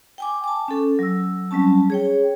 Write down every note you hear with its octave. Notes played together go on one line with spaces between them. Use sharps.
G5 G#5 D6
A5 D6
C#4 A4
F#3 E6
F#3 G3 C4 C#4 A5
G#4 C#5 G5